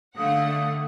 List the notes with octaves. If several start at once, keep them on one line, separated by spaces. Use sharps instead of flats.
D3 A3 F5 F#5 D#6